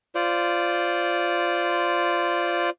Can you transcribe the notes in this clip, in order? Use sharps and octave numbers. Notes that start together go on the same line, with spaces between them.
F4 C5 D5